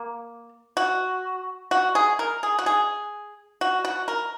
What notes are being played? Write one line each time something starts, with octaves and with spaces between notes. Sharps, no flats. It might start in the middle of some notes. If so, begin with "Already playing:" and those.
Already playing: A#3
F#4
F#4
G#4
A#4
G#4
F#4
G#4
F#4
F#4
A#4